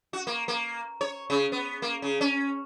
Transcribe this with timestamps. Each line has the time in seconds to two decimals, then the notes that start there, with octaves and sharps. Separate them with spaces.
0.13 F#4
0.27 A#3
0.48 A#3
1.01 C#5
1.30 C#3
1.52 B3
1.82 A#3
2.02 C#3
2.21 C#4